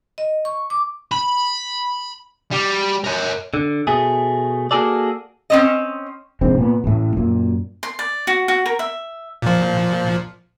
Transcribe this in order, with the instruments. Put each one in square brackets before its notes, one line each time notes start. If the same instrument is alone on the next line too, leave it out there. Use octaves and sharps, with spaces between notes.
[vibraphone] D#5
C#6
D6
[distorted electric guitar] B5
G3
A#4 C#5
[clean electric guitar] D3
B2 A3 G#4
A#3 F#4 G#4 A4 D5
[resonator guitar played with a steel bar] C4 C#4 D#5
[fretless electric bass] F1 A#1 G#2 C4
A#2 B3
A1 A2
F#2 A#2
[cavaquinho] C6
D5
F#4
F#4
A#4
E5
[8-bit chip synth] A#2 F3